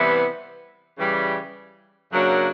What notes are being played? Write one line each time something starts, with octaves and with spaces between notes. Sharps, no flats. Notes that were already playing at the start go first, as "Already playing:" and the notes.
Already playing: C3 E3 G3 B3 E4
C#3 E3 G3
F#2 C#3 F#3 A#3 D4